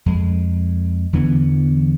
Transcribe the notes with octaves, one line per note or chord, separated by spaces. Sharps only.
F2 G#3
E2 D3 E3 B3